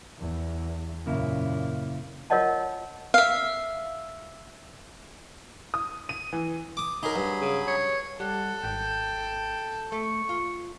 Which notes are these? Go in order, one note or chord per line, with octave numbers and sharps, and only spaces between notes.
E2
F#2 A#2 C#3 A#3 E4
F4 A#4 C#5 D#5 F#5 A5
E5 F5
D#6
D#7
E3
D6 D#6
F#3 D#4 G#4 A#4 B5
G2
C#3
C#5
G3 A4 F#5
G#1 G5
A3 C#6
F4